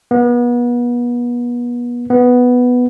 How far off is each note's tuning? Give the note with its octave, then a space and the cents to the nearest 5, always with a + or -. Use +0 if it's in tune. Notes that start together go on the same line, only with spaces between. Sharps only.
B3 -35
B3 +0